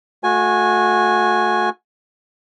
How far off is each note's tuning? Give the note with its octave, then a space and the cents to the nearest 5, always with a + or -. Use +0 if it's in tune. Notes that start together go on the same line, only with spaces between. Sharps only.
A3 +0 F#4 -25 G#5 +0